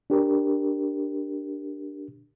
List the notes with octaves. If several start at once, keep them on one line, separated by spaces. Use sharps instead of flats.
D4 G4 A#4